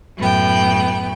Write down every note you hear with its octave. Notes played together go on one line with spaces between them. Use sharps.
F#2 A2 B3 G5